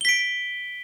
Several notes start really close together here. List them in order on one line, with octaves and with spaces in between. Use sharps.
G7 B6 D7